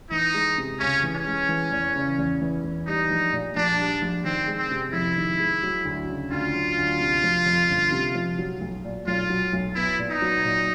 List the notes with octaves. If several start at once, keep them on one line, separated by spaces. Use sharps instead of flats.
E3 D#4
G#3
C3
C#2 C#4
E3
C#4
G#3
E3
E2
C#3
E2
E3
E2
G3 D#4
A#1
A#2
A#1 D4
G3
A#1
D#3 C4
G#3
C4
C3
F2 E4
D#3
G#3
F#3
D2
C#3
D2 F4
F#3
D2
C3
F3
F2
G1
C3
F3
F#3
B1
A#2
B1 F4
F#3
B1
B3 E4
A#2
D#4
F#3
A#2